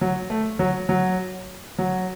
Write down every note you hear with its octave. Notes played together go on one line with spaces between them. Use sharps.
F#3
A3
F#3
F#3
F#3